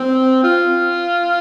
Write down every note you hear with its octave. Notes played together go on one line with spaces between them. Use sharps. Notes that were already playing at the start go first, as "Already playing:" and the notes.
Already playing: C4
F4